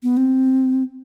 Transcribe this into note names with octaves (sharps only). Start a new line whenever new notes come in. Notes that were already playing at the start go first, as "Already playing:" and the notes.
B3
C4